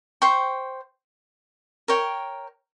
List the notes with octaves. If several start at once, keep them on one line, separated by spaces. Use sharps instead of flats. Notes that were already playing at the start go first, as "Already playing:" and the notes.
C5 G5 C#6
A#4 C#5 G5